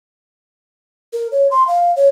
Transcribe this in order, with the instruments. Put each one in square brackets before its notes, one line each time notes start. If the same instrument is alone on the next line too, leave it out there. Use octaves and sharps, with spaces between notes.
[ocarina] A#4
C#5
C6
F5
C#5